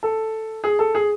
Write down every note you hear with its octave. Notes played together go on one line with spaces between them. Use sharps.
A4
G#4
A4
G#4